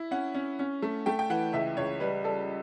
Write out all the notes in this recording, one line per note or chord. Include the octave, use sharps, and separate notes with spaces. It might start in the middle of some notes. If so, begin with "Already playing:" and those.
Already playing: E4
C#4 F#5
C#4
C#4
A3
A3 G5
G5
E3 F#5
C#2 E5
C#2 C#5
G3 B4
G3 A4